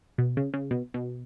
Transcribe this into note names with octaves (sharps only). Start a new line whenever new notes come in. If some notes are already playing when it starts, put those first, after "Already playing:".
B2
C#3
C#3
B2
B2